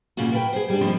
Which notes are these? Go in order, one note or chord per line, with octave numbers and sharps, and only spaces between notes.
A#2 C#3 G3 F4 F#4
A#4 B4 G5
G#4 C5
G3 D4
D3 D#3 F3 B3 C4 E4